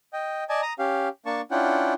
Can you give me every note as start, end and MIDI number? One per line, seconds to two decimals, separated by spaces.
0.13 0.44 75
0.13 0.44 79
0.49 0.61 74
0.49 0.61 75
0.49 0.61 80
0.49 0.61 81
0.62 0.73 82
0.62 0.73 87
0.79 1.08 61
0.79 1.08 67
0.79 1.08 77
1.26 1.41 58
1.26 1.41 62
1.26 1.41 81
1.26 1.41 85
1.51 1.94 61
1.51 1.94 62
1.51 1.94 64
1.51 1.94 65
1.51 1.94 78
1.51 1.94 79